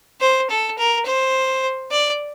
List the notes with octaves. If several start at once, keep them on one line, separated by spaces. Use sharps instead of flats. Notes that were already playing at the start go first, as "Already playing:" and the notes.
C5
A4
A#4
C5
D5